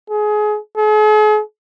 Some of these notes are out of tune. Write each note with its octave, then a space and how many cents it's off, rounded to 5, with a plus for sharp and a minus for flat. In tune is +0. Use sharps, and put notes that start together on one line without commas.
G#4 +25
G#4 +45